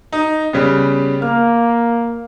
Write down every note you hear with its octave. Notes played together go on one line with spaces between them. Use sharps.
D#4
C#3 G3 B3
A#3 F6